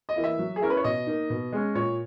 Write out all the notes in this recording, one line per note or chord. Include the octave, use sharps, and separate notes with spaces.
D#5
E3 A#3 E4
E5
F#3
G#4
C#4 E4 A#4
B4
C#5
B2 D#5
A#3 D#4
B2
G#3 C#4
A#2 C#5